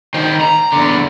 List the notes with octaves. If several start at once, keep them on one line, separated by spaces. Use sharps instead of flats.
D#3 C5
A#5
E2 D3